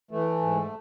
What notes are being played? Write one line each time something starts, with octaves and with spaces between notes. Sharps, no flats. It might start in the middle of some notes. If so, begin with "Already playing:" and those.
E3 A3
G#2